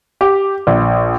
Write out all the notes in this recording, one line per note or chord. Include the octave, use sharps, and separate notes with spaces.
G4
A#1